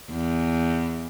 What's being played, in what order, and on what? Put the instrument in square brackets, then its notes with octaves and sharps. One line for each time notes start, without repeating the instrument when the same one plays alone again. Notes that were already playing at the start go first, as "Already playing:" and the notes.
[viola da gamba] E2